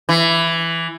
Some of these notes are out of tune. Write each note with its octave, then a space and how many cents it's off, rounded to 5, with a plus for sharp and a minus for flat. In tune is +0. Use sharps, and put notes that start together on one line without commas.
E3 +10